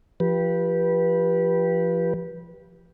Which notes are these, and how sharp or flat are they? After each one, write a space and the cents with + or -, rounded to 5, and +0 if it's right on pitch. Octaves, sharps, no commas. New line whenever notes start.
F3 -25 G4 +0 B4 -20